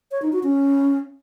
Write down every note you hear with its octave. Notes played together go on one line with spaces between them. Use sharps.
C#5
D#4
F#4
C#4